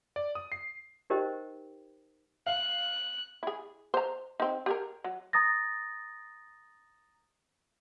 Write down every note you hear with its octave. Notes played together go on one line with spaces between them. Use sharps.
D5
D#6
C7
D#4 G4 A#4 C5 D#5 G5
F5 F#6
E4 G#4
C5 A#5
C4 D#4
G4 G#4 A#4
F#3
A#5 D#6 A6 A#6